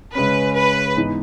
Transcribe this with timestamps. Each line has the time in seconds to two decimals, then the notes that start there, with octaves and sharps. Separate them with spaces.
0.15 C#3 G#3 C#4 B4
0.56 B4
0.97 G#2 E3 B3 D#4